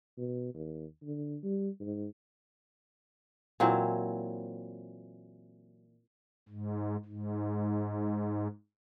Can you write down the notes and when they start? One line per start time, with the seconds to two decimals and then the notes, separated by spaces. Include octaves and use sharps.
0.18 B2
0.54 D#2
1.03 D3
1.44 G3
1.81 G#2
3.60 A#2 E3 F#3 C4
6.49 G#2
7.05 G#2